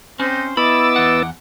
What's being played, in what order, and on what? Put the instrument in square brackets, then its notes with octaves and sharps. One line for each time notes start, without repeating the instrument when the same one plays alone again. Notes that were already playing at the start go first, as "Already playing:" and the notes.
[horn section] C4 C5 [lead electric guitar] C#4 [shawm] D#4
[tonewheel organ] B3 E6 A6 [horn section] E4 D#5 [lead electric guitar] B5 [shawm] D6
[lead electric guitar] E2 F#5